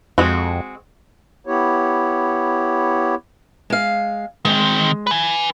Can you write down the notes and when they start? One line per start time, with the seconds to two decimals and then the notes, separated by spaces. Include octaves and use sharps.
0.18 F2 G#3 C4 F#4
1.47 B3 E4 G4 C#5
3.70 G#3 F5
4.45 D#3 G#3 C4
5.07 B4 G#5